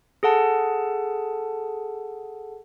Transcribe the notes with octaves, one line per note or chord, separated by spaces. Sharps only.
G#4 A4 F#5 A5